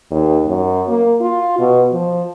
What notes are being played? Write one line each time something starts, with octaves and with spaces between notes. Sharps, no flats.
D#2
F#2
A#3
F4
B2
F3